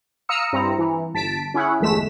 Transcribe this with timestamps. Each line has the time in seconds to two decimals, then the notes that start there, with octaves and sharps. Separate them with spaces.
0.29 F5 A#5 D#6 E6 C#7
0.53 G2 C4 E4 A#5
0.78 E3
1.14 G1 A5 B6 D7
1.54 C#4 E4 G#4 F#5
1.80 G1 E2 G#3 A3 B6 E7